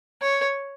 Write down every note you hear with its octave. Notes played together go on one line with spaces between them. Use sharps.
C#5